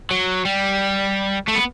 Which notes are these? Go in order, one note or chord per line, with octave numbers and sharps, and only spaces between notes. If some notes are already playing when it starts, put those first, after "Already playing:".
F#3
G3
A3
B3